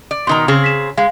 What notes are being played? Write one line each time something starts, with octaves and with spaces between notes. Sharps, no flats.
D5
B2 D#3 A#5 C6
C#3 C4 G#4
B6 E7
G#3 F5